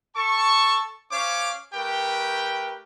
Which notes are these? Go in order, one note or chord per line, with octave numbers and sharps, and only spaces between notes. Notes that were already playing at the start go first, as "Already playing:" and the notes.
A4 A5 C#6
C#4 C5 C#5 F5 D6
A3 G4 A#4 B4 G5